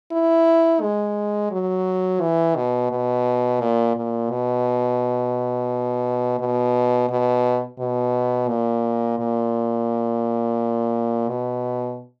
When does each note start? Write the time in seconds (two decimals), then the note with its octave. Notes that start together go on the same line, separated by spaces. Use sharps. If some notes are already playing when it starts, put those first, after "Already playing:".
0.12 E4
0.81 G#3
1.51 F#3
2.21 E3
2.56 B2
2.91 B2
3.60 A#2
3.96 A#2
4.30 B2
6.39 B2
7.10 B2
7.79 B2
8.49 A#2
9.19 A#2
11.28 B2